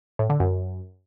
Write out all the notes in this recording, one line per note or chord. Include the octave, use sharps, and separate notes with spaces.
A2
D3
F#2